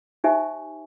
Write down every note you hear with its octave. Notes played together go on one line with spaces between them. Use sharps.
D#4 G4 C5 E5 G#5 C#6